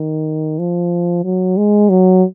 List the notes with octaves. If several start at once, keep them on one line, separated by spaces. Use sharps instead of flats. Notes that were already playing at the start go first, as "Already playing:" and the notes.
Already playing: D#3
F3
F#3
G#3
F#3